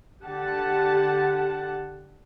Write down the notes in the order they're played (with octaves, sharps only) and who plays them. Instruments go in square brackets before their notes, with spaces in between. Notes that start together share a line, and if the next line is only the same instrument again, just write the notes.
[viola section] D3 G4 F#5 A5